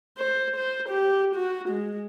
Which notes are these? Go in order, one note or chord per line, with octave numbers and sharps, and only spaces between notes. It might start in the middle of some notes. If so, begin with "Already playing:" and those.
C5
C5
G4
F#4
G#3